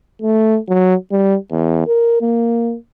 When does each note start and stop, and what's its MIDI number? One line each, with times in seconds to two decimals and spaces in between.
0.22 0.59 57
0.69 0.95 54
1.11 1.37 55
1.51 1.84 40
1.87 2.17 70
2.21 2.76 58